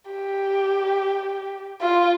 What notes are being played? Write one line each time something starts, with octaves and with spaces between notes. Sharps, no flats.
G4
F4